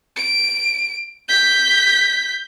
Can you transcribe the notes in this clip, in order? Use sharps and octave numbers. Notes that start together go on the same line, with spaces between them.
D7
G6 B6